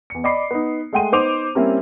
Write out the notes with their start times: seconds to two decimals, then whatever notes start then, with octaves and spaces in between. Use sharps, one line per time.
0.10 E2 C#7
0.24 D5 D#5 B5 D6 C7
0.51 B3 D#4
0.93 G#3 A3 F#5 G5 C6 D#7
1.12 B3 D#4 C5 D6 F7
1.55 G3 A#3 C4 C#4 E4